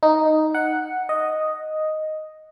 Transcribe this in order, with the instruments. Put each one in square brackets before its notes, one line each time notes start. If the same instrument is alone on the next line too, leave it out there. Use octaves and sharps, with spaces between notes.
[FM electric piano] D#4
F#5
D#5